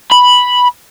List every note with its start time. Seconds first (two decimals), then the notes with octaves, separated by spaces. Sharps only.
0.11 B5